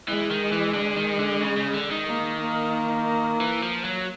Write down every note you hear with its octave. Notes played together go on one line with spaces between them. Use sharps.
E3 G#3
D#3
E3
D3
D#3
D3
C#3
C#3
D3
D#3
A#3
A#3
E3
F3
F#3